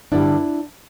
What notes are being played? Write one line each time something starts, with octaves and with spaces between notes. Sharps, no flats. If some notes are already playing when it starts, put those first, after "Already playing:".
G2 D3 G3 D4 E4